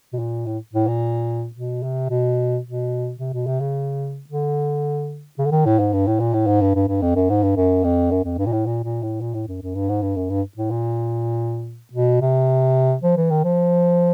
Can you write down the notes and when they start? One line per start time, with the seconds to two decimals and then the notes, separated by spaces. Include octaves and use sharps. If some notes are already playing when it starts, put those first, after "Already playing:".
0.13 B2
0.19 A#2
0.46 A2
0.73 A2
0.87 A#2
1.55 B2
1.83 C3
2.10 B2
2.65 B2
3.19 C3
3.33 B2
3.47 C3
3.60 C#3
4.29 D3
5.38 C#3
5.45 D3
5.52 D#3
5.65 A2
5.79 G#2
5.93 G2
6.07 A2
6.20 A#2
6.34 A2
6.47 G#2
6.61 G2
6.75 G2
6.88 G2
7.02 F2
7.16 F#2
7.30 G#2
7.43 G2
7.57 F#2
7.84 F2
8.11 F#2
8.24 F2
8.38 G2
8.46 A#2
8.52 A2
8.66 A#2
8.84 A#2
9.03 A2
9.21 A#2
9.34 A2
9.48 F#2
9.62 F#2
9.75 G2
9.89 G#2
10.02 G2
10.16 F#2
10.30 G2
10.57 A2
10.71 A#2
11.93 B2
12.21 C3
13.03 F3
13.17 E3
13.30 D#3
13.44 F3